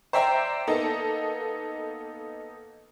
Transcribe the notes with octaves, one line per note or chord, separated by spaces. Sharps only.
C5 D5 E5 G5 A#5
A#3 B3 D#4 A4